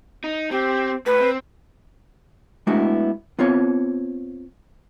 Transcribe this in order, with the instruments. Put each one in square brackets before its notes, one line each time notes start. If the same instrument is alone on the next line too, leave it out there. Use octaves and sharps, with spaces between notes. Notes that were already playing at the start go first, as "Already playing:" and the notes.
[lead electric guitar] D#4
[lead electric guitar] C4 [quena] G4
[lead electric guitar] A2 [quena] B4
[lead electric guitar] C4
[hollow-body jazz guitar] G#3 A3 B3 D4 E4 F#4
B3 C4 F4 C#5